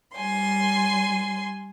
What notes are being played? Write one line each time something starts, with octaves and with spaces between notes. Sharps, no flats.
G3 G#5 C6